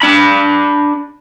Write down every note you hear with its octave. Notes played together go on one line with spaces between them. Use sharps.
D4 B5